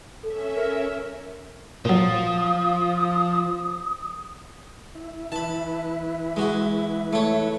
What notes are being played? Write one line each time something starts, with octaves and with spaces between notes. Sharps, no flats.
C#4 A4 E5
A#4
A#2 F3 F#3 D#6
E4
E3 E4 B4 A5 B5
G#3 F#4
A3 C#5